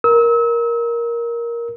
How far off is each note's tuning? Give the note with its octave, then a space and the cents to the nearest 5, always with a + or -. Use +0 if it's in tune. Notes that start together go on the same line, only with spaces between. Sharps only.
A#4 +10 E6 -35